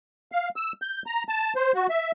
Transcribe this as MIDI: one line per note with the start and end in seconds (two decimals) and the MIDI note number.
0.32 0.49 77
0.56 0.72 88
0.82 1.02 91
1.06 1.23 82
1.29 1.53 81
1.56 1.72 72
1.75 1.87 66
1.89 2.11 76